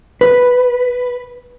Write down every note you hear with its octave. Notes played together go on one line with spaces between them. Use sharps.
B4